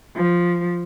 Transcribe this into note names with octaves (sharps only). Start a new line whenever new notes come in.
F3